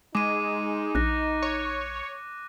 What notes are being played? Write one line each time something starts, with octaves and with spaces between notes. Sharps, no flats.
G#3 D#4 D6 D#7
A#1 F#6 A#6
C#5